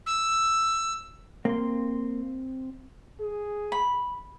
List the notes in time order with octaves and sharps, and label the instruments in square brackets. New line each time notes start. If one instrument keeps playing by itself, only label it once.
[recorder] E6
[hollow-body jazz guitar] A#3 [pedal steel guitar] C4 C6
[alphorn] G#4
[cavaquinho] B5